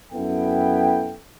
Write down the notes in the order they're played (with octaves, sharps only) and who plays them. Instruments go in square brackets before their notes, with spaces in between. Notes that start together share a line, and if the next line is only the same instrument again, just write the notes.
[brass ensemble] F#2 B3 E4 A4 G5